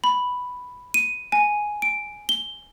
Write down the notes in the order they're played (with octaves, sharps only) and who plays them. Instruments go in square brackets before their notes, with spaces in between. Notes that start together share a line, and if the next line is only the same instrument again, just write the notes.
[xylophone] B5
D#7
G#5
D7
G7